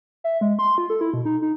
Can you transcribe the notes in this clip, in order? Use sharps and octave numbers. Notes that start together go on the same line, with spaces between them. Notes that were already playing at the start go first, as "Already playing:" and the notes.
E5
G#3
C6
F4
A4
E4
B2
D#4
D#4